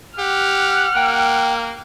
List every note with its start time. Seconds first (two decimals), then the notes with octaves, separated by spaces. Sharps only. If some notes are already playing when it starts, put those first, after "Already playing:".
0.19 G4 F#5 F6
0.96 A#3 G5